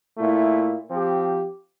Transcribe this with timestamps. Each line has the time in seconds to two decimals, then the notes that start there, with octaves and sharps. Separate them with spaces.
0.18 A#2 A3 E4
0.89 F3 C4 G4